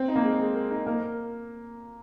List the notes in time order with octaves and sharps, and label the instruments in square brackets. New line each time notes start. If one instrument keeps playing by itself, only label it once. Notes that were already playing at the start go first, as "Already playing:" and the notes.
Already playing: [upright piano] C4
[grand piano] D#4
[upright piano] A#3
[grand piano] G#3
G#3
A#4
D#4
[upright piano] A#3 [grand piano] A#4